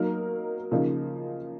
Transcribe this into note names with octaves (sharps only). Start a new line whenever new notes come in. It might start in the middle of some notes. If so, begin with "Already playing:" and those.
Already playing: F#3 A#3 D#4 A#4
C#3 F3 A#3 D#4